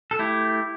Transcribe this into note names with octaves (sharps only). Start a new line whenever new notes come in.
A4
A3 E4 G4